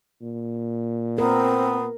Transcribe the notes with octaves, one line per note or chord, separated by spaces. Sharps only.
A#2
B3 C4 A#4